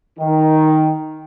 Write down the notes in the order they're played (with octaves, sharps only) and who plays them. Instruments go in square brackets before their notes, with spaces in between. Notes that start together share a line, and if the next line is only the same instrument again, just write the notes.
[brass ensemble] D#3